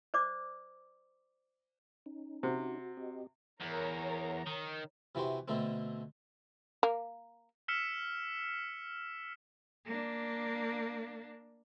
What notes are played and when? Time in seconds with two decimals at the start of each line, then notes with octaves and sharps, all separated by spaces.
0.14 C5 D5 D6
2.06 C#4 D#4
2.43 C3 F#4
2.97 C4 G4 D#5
3.60 E2 A#4 C#5 A#5
4.46 D#3
5.15 C3 E3 F#4 G4 C5
5.48 B2 D3 A3 C4
6.83 A#3
7.68 E6 F6 B6 C#7 E7
9.85 A#3 D4